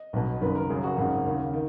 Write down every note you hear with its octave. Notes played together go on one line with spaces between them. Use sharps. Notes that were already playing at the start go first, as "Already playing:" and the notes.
Already playing: D#5
B1 B2
F#1 F#2 D#3 B4
A#4
F#1 F#2 C#3 G#4
F#4
G#1 F#2 C#3 F#4
D#2 C#3
D#3